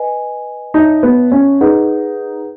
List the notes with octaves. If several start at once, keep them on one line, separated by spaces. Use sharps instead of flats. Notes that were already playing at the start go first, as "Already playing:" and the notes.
Already playing: B4 D#5 G#5
D#4 C#5 E5 A5
B3
C#4
D#4 G#4 B4 F#5